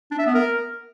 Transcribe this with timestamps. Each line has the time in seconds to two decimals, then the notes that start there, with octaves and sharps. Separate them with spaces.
0.11 D4
0.19 E5
0.27 B3
0.34 A#4